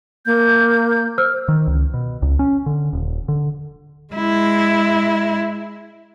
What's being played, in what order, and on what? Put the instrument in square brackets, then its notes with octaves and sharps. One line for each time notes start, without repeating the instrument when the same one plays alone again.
[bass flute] A#3 [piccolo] G6
[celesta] C5 E6 F6
[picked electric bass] D#3
C#2
B2
C#2
C#4
D3
D#1
D3
[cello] G#3 E4